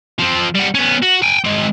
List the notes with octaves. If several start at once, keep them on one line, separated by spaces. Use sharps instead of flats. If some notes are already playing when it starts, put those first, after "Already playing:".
F3 C4
G3 F#4
B3 C#4
F#4
G5 G#5
G#3 C4